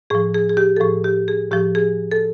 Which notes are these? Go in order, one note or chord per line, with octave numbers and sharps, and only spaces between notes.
A2 F3 G#4
G#4
G#4
G4
A4
A2 F3 G#4
G4
G#4
A2 F3 G4
G#4
A4